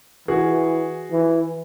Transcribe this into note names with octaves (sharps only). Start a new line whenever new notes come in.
E3 F#4 G#4
E3